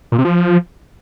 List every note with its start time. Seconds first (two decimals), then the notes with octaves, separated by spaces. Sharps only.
0.12 A#2
0.18 C3
0.25 F3